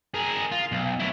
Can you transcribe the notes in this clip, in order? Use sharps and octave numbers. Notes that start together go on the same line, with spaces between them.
G#4 A#4
F4
B1
F#3 E4